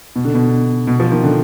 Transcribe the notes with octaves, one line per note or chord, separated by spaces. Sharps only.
B2
D3
B2
B2
F3
D#3
D3